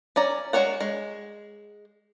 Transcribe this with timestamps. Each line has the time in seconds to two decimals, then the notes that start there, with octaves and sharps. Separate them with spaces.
0.16 C#4 D5 A#5
0.53 G#3 D#4 F#4 C#5 F#5
0.81 G#3